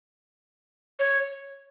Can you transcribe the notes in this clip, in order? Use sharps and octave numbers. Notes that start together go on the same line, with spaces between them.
C#5